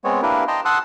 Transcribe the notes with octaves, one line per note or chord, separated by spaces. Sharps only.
G#3 B3 C4 C#5
A#3 D4 E4 G4 A#4 B4
D#5 G5 A5 A#5 C6
F#5 A5 C6 D#6 E6 F#6